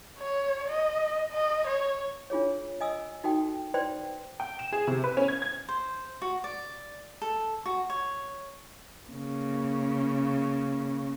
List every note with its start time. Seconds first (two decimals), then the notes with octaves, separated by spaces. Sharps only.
0.18 C#5
0.68 D#5
1.32 D#5
1.67 C#5
2.30 D4 F4 G#4 C#5
2.81 D#5 G#5 D#6 E6
3.24 D#4 F#4 A4 G5
3.74 B4 C5 D5 G5 C6
4.40 G5
4.59 E7
4.72 G#4
4.87 C3
5.04 B4
5.17 C#4
5.28 G#6
5.42 G#6
5.69 C5
6.22 F#4
6.44 D5
7.22 A4
7.66 F#4
7.90 C#5
9.09 C#3 A#3